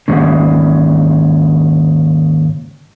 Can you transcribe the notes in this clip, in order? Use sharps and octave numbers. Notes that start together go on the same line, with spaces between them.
D#2 G#2 C#3